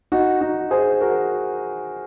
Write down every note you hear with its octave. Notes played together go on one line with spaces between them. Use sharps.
D#4 F#4
D#4 F#4
G#4 C5
F#4 A#4